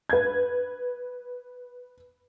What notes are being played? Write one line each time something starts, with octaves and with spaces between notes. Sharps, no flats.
B4 G#6